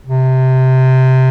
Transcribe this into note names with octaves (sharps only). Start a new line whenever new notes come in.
C3